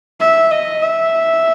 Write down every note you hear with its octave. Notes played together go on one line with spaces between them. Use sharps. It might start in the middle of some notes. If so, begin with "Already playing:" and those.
E5
D#5
E5